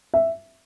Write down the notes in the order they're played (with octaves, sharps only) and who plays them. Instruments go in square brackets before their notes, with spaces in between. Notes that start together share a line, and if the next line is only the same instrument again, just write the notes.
[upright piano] E5